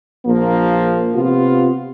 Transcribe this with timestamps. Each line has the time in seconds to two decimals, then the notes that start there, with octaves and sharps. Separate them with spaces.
0.25 A#1 F3 A#3
1.14 C3 B3 F4